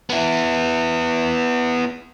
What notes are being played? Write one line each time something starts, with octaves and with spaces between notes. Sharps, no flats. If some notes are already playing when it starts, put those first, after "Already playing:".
B3 E4